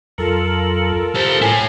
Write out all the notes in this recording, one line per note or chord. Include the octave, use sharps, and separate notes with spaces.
F2 F#3 F4 A4 A#4
G3 C5
A2 E4 C#5 G#5